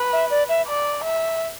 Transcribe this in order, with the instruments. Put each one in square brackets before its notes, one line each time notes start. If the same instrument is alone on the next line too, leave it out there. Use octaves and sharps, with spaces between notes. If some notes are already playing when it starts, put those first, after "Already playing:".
Already playing: [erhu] B4
[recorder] E5
D5
E5
[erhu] D5
E5